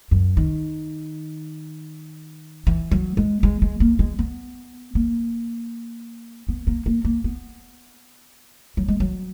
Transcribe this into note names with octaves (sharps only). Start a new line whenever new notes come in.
F#2
D#3
E3
F#3
G#3
G#3
G#3
A#3
G#3
B3
A#3
B3
A#3
A#3
A#3
B3
F#3
G#3
F#3